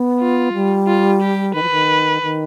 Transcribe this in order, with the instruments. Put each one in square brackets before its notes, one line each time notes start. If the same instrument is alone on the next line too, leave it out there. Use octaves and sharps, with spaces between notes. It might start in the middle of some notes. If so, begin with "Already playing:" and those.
Already playing: [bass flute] B3
[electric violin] F4
[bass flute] G3
[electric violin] F4
G4
[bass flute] D#3 [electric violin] B4
[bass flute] F3
D#3
D#3